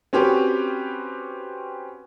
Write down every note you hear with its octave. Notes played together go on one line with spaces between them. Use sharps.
C4 C#4 F#4 G4 B4